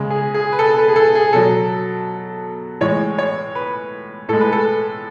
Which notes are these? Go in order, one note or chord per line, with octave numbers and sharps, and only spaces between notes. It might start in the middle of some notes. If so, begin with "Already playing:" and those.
Already playing: C#3 G#3
G#4
G#4
B4
A4
A4
B4
G#4
A4
G#4
B2 F#3 A4
A2 E3 G#3 C#5
C#5
B4
A2 G#3 A4
B4
A4